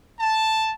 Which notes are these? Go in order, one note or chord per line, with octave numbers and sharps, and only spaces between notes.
A5